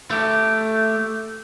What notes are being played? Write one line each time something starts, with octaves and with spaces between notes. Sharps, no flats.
A3 G4